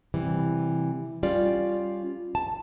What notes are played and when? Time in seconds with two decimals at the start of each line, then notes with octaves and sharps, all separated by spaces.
0.14 C3 E3 G3
1.23 G3 C#4 F4 D5
2.35 A5